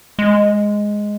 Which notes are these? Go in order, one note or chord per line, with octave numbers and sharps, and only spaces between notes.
G#3